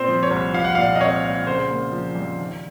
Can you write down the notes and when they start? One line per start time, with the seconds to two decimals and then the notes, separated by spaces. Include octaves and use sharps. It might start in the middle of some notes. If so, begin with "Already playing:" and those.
Already playing: A#2 C4 C5
0.08 F3
0.23 C#5
0.31 C2
0.54 F3 F5
0.64 F#5
0.75 A#2 F5
0.95 D#5
1.00 C4 C#5
1.23 A#2
1.46 C#3 C5
1.70 A#3
1.92 F3
2.16 F2
2.38 D#3